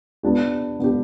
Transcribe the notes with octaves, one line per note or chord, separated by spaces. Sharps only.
B3 D4 G4
B3 D4 G4